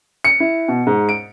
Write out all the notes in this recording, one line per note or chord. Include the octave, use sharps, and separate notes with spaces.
C#7
E4
B2
G#2
D7